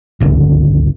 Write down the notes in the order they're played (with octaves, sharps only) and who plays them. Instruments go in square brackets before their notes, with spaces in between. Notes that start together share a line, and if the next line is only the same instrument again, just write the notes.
[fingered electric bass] D1 G1 C#2 D3